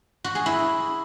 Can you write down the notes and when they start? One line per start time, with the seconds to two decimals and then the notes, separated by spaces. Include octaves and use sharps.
0.24 F#4
0.35 G#4
0.46 E4